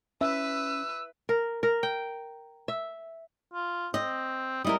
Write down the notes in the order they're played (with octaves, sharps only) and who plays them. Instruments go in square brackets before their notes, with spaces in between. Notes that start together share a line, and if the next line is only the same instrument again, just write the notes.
[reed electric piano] C#4 [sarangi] B4 [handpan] E5 [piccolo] E6
[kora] A#4
A#4
G5
E5
[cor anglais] F4
[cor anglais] C4 [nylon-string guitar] D#5
[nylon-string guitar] G3 E4 A#4 [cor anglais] D#5